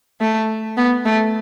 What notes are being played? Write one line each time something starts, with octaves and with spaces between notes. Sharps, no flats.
A3
B3
A3